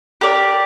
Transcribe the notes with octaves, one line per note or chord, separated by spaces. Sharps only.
G4 A#4 D5